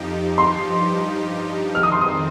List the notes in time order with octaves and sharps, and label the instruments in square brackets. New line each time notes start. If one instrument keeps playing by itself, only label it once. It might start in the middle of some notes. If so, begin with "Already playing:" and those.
Already playing: [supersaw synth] F2 F3 D#4 G4
[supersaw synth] G2 F3 D#4 G4 [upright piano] C6
[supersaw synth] F2 D#3 C4 [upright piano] F6
[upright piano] D#6
C6
D#6